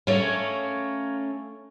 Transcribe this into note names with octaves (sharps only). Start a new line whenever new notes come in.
A3 A#3 C#4 C#5